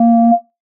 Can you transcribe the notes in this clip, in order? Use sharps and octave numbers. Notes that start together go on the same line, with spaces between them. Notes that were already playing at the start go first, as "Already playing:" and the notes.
Already playing: A#3